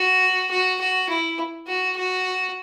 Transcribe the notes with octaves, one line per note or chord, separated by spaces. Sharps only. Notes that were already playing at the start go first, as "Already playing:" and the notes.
Already playing: F#4
F#4
F#4
E4
F#4
F#4